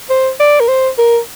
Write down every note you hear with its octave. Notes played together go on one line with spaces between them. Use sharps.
C5
D5
A#4
C5
A#4